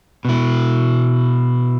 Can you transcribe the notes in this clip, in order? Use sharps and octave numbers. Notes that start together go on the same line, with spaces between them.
B2 E4